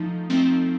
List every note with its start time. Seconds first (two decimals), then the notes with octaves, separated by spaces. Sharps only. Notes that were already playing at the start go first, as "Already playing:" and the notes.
Already playing: F3 A3 D#4
0.30 F3 A3 C4 D#4